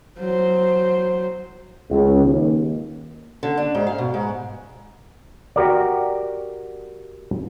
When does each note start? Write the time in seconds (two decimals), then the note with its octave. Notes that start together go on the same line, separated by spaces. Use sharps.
0.18 F#3 C5
1.90 C#2
2.24 D#2
3.43 D3
3.58 D4
3.75 G#2
3.87 F5
3.98 B2
4.14 G#2
5.56 F#4 G4 A#4 D5